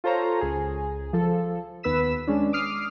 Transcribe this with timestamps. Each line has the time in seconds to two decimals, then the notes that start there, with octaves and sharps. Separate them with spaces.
0.04 F4 A4 C5 C#5 A#5
0.41 C#2 G#4
1.13 F3 A4
1.83 D#2 B3 B4 E6 B6 E7
2.27 G#3 C#4 D4
2.53 D6 D#6 F6 C7